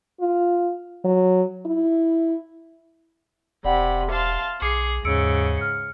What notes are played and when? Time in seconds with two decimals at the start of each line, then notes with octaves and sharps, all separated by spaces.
0.20 F4
1.05 F#3
1.66 E4
3.64 E1 C3 D5 F#5 G5 B5
4.10 E5 F5 A5 C6
4.62 B1 G#4 D6 C7 C#7
5.05 D#2 G#2 C#3 E6 C#7 D7
5.57 F6 C#7